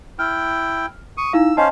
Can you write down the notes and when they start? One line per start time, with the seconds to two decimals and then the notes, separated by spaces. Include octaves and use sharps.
0.19 E4 G5 F6
1.17 C#6 D#6
1.33 D#4 E4 F5 E6
1.57 C#4 C5 D#5 F5 G#5 A5